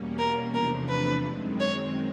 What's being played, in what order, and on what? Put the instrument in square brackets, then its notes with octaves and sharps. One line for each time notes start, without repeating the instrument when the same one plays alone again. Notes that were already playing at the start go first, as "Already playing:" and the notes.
Already playing: [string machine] E2 B2 G3 A#3 C#4
[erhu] A#4
[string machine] E2 C3 F3 A3 D4 [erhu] A#4
[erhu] B4
[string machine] F#2 D#3 G#3 C4
[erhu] C#5